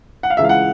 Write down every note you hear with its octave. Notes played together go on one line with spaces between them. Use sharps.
F#5
F5
C#2 C#3 E3 E5
F5
F#5